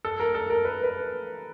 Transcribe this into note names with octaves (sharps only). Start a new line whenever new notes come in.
A4
A#4
A4
A#4
B4
B4